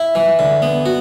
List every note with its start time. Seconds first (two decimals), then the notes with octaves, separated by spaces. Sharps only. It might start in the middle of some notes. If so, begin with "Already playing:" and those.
Already playing: E4
0.15 E3
0.39 D3
0.62 B3
0.86 F#4